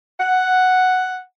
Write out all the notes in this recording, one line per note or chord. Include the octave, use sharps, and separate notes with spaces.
F#5